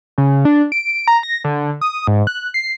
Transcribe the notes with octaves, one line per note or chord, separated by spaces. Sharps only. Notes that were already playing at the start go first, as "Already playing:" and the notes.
C#3
D4
D7
A#5
A#6
D3
D#6
G#2
F#6
C7